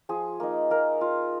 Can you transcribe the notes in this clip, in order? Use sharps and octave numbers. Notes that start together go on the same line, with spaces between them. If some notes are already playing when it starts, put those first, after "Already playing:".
F3 G#4
A#3 D#4
A#3 A#4
F4